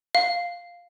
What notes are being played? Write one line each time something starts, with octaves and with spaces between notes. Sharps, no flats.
F5